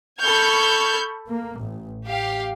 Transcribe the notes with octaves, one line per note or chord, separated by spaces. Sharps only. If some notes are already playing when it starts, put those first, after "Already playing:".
A4 B5 C#6 F6 G6 G#6
A#3
A1
G4 F5